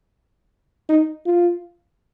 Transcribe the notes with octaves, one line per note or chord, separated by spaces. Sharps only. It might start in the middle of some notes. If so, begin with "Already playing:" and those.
D#4
F4